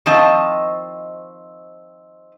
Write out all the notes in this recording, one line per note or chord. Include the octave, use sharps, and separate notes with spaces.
D#3 F3 C4 C5 D#5 A5